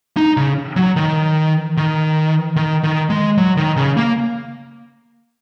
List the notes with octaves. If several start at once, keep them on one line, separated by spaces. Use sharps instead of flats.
D#4
C#3
F#3
D#3
D#3
D#3
D#3
G#3
F#3
D#3
C#3
A#3